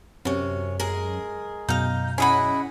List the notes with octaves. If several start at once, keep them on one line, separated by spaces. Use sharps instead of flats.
F#2 C3 C#4
G#3 G#4 A#4
F#2 B2 F#3 D#4 F5 G6
C#4 E4 G#4 D#5 F#5 B5